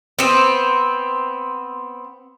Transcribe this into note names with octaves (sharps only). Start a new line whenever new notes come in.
B3 C4